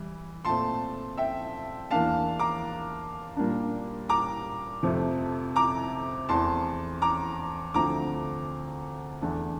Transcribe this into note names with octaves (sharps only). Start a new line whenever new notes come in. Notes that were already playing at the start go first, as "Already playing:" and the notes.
Already playing: E3 G3
A#2 A3 C4 A5 C6
E5 G5
E2 E3 A#3 D4 F5 A5
A#5 D6
A#2 G3 A#3 D4
A#5 D6
F2 C3 F3 A3
A#5 D6
E2 E3 A3 C4 A5 C6
A#5 D6
D2 D3 F3 A3 C4 A#5 D6
E2 E3 A3 D4